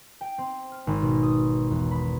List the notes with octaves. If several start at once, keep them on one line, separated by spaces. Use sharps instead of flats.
G5
C4
F6
G#1
B2
D#6
E2
B5